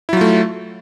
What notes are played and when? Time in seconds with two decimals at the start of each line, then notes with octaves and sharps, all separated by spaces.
0.09 E4
0.13 F#3
0.17 F4
0.21 A3